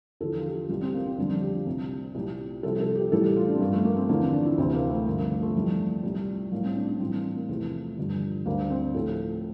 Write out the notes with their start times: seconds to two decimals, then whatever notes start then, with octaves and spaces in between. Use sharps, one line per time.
0.20 E2 D3 F3 A4
0.38 F4
0.46 G4
0.69 C2 A#2 G3 G4
0.82 C4
0.94 A#3
1.06 C4
1.18 F2 D3 G3 D4
1.30 D4
1.42 G4
1.55 F4
1.66 C2 C3 G3
2.15 C2 A#2 G3 G4
2.63 C2 C3 F3 A4
2.80 A4
2.96 G4
3.12 A2 E3 G3 A4
3.24 G4
3.36 F4
3.48 D4
3.54 C4
3.60 G2 F3 A#3
3.73 A3
3.85 A#3
3.97 C4
4.09 E2 D3 F3 A#3
4.21 C4
4.33 D4
4.45 E4
4.58 D2 C3 E3 C4
4.74 A#3
4.90 A3
5.06 G2 D3 F3 A#3
5.18 A#3
5.30 A3
5.43 A3
5.55 F2 E3 G3
6.03 C2 A#2 G3
6.51 A2 G3 A#3
6.64 C4
6.76 D4
6.88 D4
7.00 A2 E3 G3 C4
7.13 A#3
7.25 C4
7.36 A#3
7.49 E2 C3 F3 A3
7.97 G2 D3 F3
8.46 D2 D3 G3 A#3
8.70 C4
8.94 A2 F3 A4